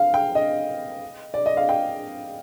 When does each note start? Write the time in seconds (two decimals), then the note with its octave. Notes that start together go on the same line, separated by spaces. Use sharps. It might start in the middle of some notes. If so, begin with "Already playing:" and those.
Already playing: F5
0.14 G5
0.35 D#5
1.34 D5
1.46 D#5
1.57 F5
1.69 G5